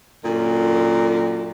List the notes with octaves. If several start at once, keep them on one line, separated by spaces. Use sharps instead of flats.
F#2 A#2 D3